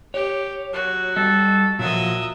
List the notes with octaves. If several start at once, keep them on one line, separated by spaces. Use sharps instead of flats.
G4 C#5
F#3 F#4
G3 A4 D#5
A#2 F3 F#3 D#5 E5